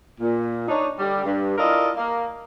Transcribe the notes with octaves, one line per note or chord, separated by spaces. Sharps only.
A#2
D4 D#4 C#5
D3 G3
G2
E4 F4 A4 A#4 D5 D#5
A#3